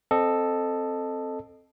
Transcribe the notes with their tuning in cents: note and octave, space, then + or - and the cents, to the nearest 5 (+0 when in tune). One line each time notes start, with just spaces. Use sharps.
C4 +5 A4 +0 D#5 -20